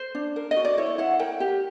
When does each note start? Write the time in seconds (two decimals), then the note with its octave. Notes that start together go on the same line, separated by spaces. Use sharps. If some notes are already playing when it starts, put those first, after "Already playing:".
Already playing: C5
0.15 D4
0.36 A#4
0.51 D#5
0.56 F#4
0.65 D5
0.77 E4 C#5
0.98 E4 F#5
1.19 A#4 G5
1.40 G4